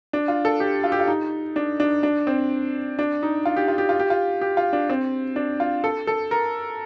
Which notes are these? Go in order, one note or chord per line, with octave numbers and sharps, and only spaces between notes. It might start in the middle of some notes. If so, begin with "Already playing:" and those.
D4
F4
A4
G4
F4
G4
F4
D#4
D4
D4
D4
C4
D4
D#4
F4
G4
F4
G4
F4
G4
F4
G4
F4
D4
C4
D4
F4
A4
A4
A#4